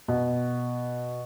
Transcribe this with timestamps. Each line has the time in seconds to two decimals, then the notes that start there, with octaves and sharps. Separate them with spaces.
0.08 B2